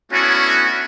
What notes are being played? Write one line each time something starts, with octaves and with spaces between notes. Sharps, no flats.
A3 B3 C#4 D4 E4 F#4